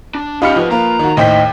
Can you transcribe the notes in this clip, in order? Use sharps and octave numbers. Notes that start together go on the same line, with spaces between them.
D4
F3 C#4 D#4 F4 G4 B5 F6 C#7
B2 F3 B4
A#3 F4 B4 A#5
D#3 F#4
D#2 A2 D#4 C5 D#5 G5 B6